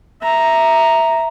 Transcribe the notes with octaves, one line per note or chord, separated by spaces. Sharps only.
E5 A#5